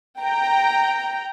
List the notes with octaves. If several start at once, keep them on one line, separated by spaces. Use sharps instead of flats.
G5 A#5